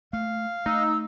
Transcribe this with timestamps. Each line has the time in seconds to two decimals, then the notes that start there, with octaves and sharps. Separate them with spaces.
0.13 A3 F5
0.66 A3 D#4 E6